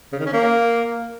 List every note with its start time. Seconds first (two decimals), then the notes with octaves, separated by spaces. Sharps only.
0.13 C#3
0.20 D#3
0.26 C#4
0.33 A#3